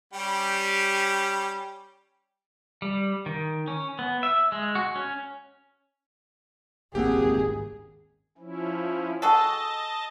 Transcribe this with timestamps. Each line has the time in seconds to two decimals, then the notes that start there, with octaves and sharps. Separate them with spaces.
0.13 G3 C#4 G4
2.82 G3
3.26 D#3
3.68 C#4
3.99 B3
4.23 E5
4.52 G#3
4.75 F#4
4.96 C#4
6.95 D#1 G#1 C#2 A#3 C4 G4 G#4 F#5
8.38 F3 C#4 E4
9.22 F#4 G#4 A4 D#5 A5